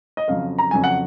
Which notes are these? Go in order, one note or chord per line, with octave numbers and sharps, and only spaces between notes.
D#5
F2 C#3 F#3 F5
A#5
F2 C#3 F#3 G#5
F#5